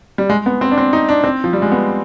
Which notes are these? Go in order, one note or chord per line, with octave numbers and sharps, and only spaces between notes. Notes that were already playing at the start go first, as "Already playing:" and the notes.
G3
G#3
B3
C4
D4
C4
D#4
D4
C4
F3
G3
G#3
B3